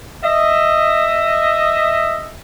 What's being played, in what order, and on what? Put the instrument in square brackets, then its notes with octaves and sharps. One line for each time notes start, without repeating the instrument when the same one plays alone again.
[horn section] D#5 E5